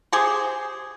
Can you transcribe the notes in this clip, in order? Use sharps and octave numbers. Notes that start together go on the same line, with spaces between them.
G4 G#4 C5